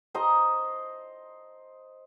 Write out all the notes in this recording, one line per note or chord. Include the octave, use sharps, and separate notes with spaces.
C5 D#5 A#5